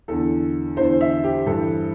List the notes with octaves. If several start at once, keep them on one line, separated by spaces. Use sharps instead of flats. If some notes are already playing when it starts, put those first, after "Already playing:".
E2 D3 A4
E2 D3 C5
E5
G4
G2 E3 A4